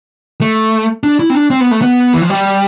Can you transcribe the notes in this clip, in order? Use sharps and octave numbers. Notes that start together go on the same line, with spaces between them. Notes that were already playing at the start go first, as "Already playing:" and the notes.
A3
D4
E4
C4
D4
C4
B3
A3
B3
E3
F3
G3